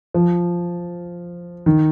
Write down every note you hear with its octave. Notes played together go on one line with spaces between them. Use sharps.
F3
D#3